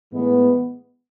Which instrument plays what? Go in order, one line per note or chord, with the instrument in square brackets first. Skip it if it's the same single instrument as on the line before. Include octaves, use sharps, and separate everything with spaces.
[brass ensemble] A2 E3 G#3 B3